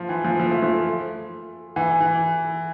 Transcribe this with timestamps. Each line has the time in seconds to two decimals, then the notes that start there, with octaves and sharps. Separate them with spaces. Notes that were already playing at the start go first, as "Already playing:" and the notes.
Already playing: F3
0.09 E3
0.25 F3
0.40 F3
0.51 A3
0.63 F3
1.76 E3
2.01 E3